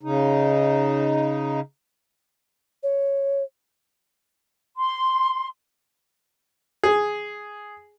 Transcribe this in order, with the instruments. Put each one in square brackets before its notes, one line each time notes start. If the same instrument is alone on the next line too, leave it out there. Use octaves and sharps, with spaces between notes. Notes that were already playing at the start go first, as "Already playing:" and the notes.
[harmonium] C#3 D#4
[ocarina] C#5
[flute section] C6
[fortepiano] G#4